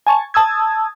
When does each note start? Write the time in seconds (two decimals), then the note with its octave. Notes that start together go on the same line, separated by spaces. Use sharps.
0.07 G#5 A5 C#6
0.34 A5 D#6 E6 G#6